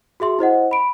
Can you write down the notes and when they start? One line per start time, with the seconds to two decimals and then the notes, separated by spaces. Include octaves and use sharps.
0.20 F#4 G#4 E5 C6
0.39 E4 C5 D#5 F#5
0.71 B5 D7